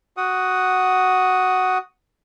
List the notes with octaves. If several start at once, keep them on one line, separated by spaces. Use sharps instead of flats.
F#4 F#5 D#6